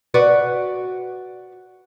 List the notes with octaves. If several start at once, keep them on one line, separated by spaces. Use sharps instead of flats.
F#4 B4 D5